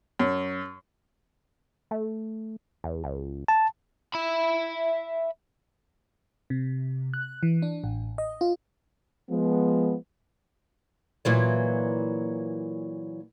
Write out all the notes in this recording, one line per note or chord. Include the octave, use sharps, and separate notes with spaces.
F#2
A3
E2
C#2
A5
E5 B5
C3
F#6
E3
D4
A1
D#5
F4
F3 G#3 B3
A#2 E3 F#3